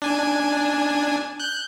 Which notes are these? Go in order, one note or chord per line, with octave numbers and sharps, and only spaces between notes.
D4 G#5
F#6 G6